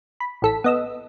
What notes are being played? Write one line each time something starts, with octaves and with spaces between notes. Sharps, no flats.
B5
A1 A4 B6
B3 D#5 E6